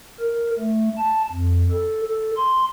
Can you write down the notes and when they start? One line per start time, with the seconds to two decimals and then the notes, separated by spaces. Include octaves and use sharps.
0.20 A#4
0.59 A3
0.98 A5
1.32 F2
1.71 A4
2.07 A4
2.37 C6